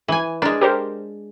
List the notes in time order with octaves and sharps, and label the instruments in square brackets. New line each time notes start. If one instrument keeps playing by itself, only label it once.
[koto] E3 G#5
[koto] G#3 D4 [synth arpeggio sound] A#4
[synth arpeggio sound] G4 A#4 C5